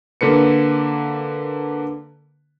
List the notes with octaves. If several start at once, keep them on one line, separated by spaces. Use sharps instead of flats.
D3 A#3 B4 C#7